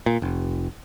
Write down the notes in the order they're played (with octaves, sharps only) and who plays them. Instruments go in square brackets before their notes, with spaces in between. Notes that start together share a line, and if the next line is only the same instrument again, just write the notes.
[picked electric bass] A#2
F1